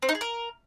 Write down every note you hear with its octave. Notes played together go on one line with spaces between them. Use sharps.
C4
D#4
G#4
A#4